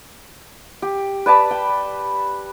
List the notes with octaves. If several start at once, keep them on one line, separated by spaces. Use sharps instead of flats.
G4
B4 D5 A5 B5
G5